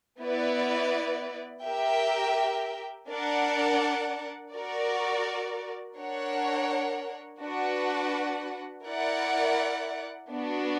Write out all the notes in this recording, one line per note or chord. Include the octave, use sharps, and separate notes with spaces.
B3 E4 B4 D5
G4 A#4 E5 G5
D4 A#4 D5 F#5
F#4 A#4 D5
D4 A#4 C#5 F#5
D4 F#4 B4 F#5
E4 A#4 D5 F#5
B3 D4 F#4